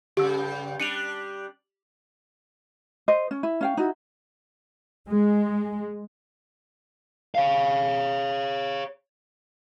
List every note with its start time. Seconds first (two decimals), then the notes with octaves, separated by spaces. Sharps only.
0.17 G2 C#3 G4 E6
0.80 G3 D4 C#7 D#7 F7
3.08 C5 D#5
3.31 C#4
3.43 E4
3.61 C#4 F5 G5
3.77 D#4 E4 F#4
5.10 G#3
7.35 C#5 F5